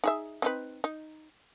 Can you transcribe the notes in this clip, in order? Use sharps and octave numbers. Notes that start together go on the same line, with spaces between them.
D#4 G#4 E5
C4 D#4 B4
D#4